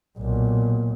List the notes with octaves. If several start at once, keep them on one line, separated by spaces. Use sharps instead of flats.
B1 A#2